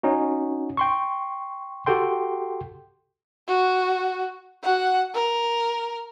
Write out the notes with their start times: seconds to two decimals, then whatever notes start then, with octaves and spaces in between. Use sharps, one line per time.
0.03 C#4 D#4 F#4
0.77 G5 C6 C#6
1.86 F#4 G4 A4 G5 C6
3.48 F#4
4.62 F#4 F#5
5.14 A#4